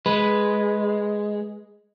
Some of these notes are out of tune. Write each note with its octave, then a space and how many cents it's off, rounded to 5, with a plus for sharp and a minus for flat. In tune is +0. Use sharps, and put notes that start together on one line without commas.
G#3 +0 B4 +0